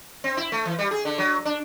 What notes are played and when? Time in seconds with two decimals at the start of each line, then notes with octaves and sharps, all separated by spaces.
0.24 C4
0.37 E4
0.52 A3
0.65 E3
0.79 G3
0.91 G#4
1.05 D3
1.18 F#3
1.45 D4